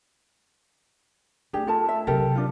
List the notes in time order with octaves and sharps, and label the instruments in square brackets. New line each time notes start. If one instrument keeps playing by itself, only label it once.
[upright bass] A3 [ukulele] D4 G4 G#4
[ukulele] F4 A4 A5
E5
[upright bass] C3 F#3 [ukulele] G4 A4 A#4
[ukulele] D4 F4